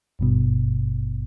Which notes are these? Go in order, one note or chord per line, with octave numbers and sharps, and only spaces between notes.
G#1 G2 B2